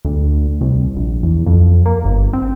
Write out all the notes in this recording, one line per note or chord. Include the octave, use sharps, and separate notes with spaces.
D2
C2
A#1
E2
F2
A#3
G1
C4